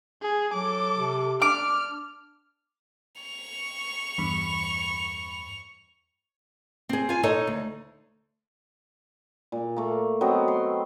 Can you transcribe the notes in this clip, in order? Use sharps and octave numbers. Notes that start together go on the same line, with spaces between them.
G#4
F#3 A4 D6
C3
D4 D6 F6
C#6 F7
E2 G2 B5
C4 G#4
F4 G#5
D#4 A4 C#5 D#5
D2
A#2
A3 A#3
F#3 B3 C4 D#5
C6